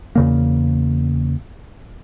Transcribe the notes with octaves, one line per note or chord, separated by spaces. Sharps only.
E2 C#3 A#3